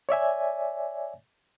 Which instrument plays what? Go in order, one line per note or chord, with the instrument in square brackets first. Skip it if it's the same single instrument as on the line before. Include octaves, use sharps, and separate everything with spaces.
[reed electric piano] C#5 D5 E5 G#5